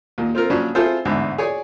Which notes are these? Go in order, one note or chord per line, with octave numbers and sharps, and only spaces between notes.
D#2 A#2
C4 F4 A#4
A#2 C#3 F3 F#3 C#4 D4
C4 E4 F4 G#4 A4 C5
A1 E2 G#2 D3
G#4 C#5 D5 G#5